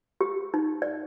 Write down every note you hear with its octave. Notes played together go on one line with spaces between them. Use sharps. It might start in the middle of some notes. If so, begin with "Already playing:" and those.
G4
D#4
D5